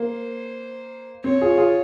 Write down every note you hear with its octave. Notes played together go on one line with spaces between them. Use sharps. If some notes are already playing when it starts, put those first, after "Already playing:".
Already playing: A#3 C5
C4 C#5
F4 G#4
F4 G#4